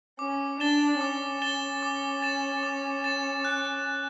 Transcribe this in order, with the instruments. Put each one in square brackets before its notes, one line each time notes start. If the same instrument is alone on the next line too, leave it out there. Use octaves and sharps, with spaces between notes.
[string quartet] C#4 [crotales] D6
[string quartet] D4 [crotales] A6 E7 G7
[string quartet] C#4 [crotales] D6
[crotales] A6 E7 G7
D6
A6 E7
D6
A6 E7
F#6